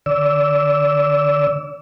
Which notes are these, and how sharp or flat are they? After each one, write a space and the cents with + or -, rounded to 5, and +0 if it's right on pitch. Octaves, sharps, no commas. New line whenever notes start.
D3 +10 D5 -30 E6 +0